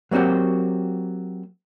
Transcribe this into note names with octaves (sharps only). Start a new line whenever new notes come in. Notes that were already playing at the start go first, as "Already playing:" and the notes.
F#3 A#3 C4 F#4 G4